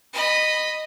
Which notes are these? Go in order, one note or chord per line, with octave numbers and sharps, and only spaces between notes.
D#5 B5